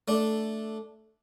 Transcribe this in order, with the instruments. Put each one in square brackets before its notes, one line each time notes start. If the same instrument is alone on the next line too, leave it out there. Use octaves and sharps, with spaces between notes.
[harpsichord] A3 D4